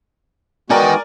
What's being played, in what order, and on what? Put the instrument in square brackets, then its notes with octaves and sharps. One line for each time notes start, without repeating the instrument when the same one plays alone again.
[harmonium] G#3 B3 F#4 [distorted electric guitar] D#4 G5 [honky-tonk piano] A#4 D5 G#5